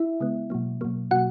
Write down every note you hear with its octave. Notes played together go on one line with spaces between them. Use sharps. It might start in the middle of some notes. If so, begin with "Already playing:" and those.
Already playing: E4 E5
C#3 G#3 B3
B2 F#3 A#3
B2 F#3 A#3
B2 F#3 A#3 F#4 F#5